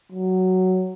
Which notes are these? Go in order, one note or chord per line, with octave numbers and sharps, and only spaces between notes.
F#3